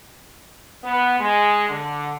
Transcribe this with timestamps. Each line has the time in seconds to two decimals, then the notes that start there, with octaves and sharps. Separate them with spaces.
0.84 B3
1.19 G#3
1.69 D3